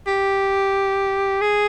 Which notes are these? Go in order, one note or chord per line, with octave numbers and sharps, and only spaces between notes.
G4
G#4